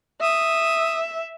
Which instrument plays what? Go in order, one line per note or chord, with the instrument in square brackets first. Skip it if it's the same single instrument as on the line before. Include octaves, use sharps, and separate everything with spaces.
[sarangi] E5 [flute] D#6